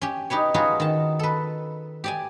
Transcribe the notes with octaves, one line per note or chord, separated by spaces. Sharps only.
C#4 G4
D#4 G4 B4 C#5
D#4 F4 F#4 G#4 B4 C#5
D#3 A5
A4 B4
G4 D5 G#5